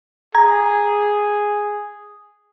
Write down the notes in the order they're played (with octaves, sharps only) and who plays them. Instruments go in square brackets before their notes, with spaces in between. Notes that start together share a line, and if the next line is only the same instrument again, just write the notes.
[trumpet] G#4 [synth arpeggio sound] A#5 G#6